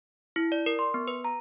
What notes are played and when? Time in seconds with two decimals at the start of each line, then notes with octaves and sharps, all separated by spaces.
0.36 E4
0.52 D5
0.66 A#4
0.79 C6
0.94 B3
1.08 B4
1.25 A#5